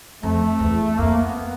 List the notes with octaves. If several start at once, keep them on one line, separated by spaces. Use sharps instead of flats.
F2 A3
E2
F2 A#3
A#3
B3